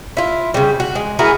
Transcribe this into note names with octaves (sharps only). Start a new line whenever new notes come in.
E4 F4
C#3 G3
F#4
G#3
E4 F#4 G#4 A#4